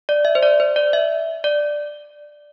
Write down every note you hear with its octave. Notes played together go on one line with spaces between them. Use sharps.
D5
E5
C5
D5
C5
D5
E5
D5